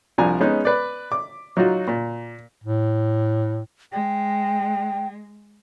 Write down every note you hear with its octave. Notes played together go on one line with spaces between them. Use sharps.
C2 F3 D4 G#5 A#5
G#3 B3 C#4 D#4
B4 D5
D6
F#3 D#4 F4 F#4
A#2
A2
G#3 G5